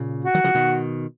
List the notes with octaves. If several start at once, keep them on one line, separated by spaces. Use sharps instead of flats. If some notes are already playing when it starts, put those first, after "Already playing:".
Already playing: A#2 C#3
F#4
D#3 F#3
C#3 F3
B2 D#3